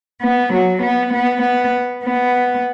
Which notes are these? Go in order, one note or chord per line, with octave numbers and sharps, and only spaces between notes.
B3
F#3
B3
B3
B3
B3